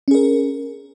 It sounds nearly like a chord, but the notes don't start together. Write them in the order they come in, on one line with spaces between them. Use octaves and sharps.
C#4 G#4 A#4